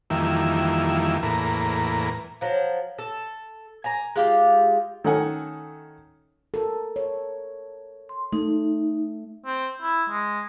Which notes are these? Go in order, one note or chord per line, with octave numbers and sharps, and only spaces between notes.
F2 D#3 E3 G3 A#3 E4
E2 A2 A#3 A#4 B4
F3 F#3
A4
G#5 A#5
G#3 F4 G4
D#3 A3 C#4 A4 F#5 G#5
A4 A#4
C#5
C6
A3 D#4
C4
E4
G#3